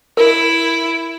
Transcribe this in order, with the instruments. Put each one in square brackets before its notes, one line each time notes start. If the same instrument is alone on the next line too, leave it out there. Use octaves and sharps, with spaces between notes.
[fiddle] E4 [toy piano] A#4